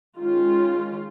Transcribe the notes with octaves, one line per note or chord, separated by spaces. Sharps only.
D#3 G#3 C#4 F4